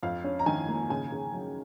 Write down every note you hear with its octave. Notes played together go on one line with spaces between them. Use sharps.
F2 F5
C#4
A#5
D#3 G#5
A#3
C#3 G#5
C#3
F#3